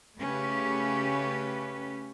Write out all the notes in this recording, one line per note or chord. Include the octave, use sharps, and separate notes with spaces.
C#3 A3 C#4 G4 B4